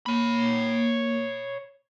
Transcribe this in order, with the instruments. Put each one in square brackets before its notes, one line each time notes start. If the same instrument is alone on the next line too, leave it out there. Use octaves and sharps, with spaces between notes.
[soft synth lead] A#3 [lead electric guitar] C#5 B5